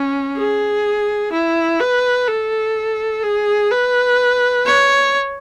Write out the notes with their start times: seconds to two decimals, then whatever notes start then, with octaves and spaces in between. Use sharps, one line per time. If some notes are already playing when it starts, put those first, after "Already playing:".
Already playing: C#4
0.37 G#4
1.32 E4
1.80 B4
2.27 A4
3.23 G#4
3.71 B4
4.66 C#5